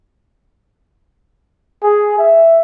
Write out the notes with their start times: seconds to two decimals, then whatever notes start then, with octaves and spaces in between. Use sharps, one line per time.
1.83 G#4
2.18 E5